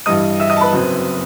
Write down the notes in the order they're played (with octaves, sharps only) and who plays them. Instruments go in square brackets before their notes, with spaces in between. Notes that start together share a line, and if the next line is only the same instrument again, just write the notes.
[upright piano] G2 E3 G3 D#5 D#6
E5 E6
D#5 D#6
A5
B4 B5
F#1 F#2 F#3 C4